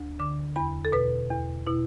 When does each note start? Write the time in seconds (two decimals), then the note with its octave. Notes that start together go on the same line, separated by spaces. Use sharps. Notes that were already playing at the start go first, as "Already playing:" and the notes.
Already playing: D2
0.19 D3 D6
0.56 E2 B5
0.85 A4
0.92 B2 B4
1.30 E2
1.67 B2 E4